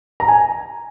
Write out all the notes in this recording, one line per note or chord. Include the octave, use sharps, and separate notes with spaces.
A#5
G#5